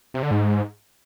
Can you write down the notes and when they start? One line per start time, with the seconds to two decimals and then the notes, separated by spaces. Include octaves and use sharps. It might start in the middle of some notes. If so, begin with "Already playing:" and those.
0.14 C3
0.23 D3
0.31 G#2